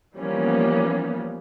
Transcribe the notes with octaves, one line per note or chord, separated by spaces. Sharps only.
E3 F3 G3 A#3 B3 C#4